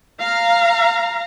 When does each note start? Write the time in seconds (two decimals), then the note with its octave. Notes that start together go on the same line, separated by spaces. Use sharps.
0.21 F5 A#5